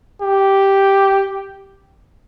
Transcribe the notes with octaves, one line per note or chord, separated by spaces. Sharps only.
G4